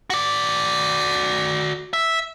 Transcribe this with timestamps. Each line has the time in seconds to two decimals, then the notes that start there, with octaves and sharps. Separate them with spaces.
0.10 F#4 D5
1.93 E5